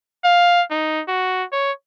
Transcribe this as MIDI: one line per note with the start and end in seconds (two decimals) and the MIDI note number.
0.24 0.62 77
0.71 1.01 63
1.08 1.44 66
1.52 1.72 73